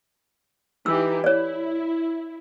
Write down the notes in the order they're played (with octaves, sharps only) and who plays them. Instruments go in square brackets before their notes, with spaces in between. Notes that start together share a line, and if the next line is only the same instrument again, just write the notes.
[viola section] E3 D#4 G4 [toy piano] E6
[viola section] E4 [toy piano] C#5 D5